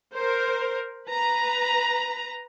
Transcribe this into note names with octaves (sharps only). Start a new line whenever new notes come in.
A#4 C5
B4 A#5